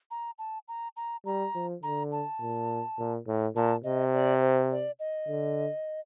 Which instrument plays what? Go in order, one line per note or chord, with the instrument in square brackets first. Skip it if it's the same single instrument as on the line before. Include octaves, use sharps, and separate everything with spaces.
[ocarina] A#5
A5
A#5
A#5
[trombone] G3 [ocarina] A#5
[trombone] F3
[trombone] D3 [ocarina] A#5
[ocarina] A5
[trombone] A#2
A#2
A2
[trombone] A#2 [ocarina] A5
[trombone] C3 [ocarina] D#5
[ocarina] D5
C5
D5
D#5
[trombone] D3